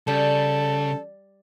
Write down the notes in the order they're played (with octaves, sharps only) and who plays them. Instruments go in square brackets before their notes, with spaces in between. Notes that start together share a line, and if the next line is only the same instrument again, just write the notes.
[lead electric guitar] C#3 [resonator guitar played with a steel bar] G3 [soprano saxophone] A4